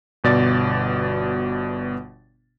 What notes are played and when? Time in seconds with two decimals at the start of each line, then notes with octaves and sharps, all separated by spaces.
0.24 G1 B2 D5 A6